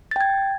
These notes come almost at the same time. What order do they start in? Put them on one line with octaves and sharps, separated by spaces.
A6 G5 G#6